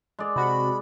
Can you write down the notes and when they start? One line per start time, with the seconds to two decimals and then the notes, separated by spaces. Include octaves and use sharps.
0.19 G#3 D5
0.36 C3 F#4 B5